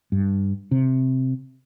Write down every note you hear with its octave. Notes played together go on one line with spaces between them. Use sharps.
G2
C3